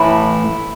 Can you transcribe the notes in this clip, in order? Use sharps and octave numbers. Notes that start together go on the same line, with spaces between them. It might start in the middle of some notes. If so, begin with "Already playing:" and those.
Already playing: A2 E3 E4